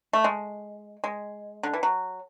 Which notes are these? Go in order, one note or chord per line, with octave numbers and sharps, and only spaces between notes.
A3
G#3
G#3
D3
E3
F#3